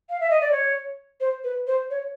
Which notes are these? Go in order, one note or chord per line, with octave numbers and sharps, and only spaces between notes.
F5
E5
D#5
D5
C#5
C5
B4
C5
C#5